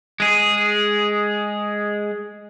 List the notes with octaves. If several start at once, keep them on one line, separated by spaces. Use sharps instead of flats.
G#3 G#4